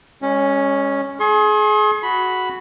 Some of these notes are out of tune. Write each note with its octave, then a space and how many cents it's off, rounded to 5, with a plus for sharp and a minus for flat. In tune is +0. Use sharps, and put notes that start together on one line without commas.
G#3 -30 C#4 +0
G#4 +30 C6 +45
F#4 +0 B5 +0